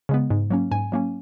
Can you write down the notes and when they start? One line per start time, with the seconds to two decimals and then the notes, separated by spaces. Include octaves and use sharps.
0.09 C#3 G#3 B3
0.30 G#2
0.50 F#3 A#3 C#4
0.71 G#2 G#5
0.92 F#3 A#3 C#4